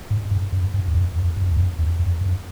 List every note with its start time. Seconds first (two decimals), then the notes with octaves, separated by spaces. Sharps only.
0.10 G#2
0.31 G2
0.52 F#2
0.74 G2
0.88 E2
0.95 F2
1.16 F2
1.37 F#2
1.51 E2
1.57 F2
1.79 E2
1.99 F2
2.21 F#2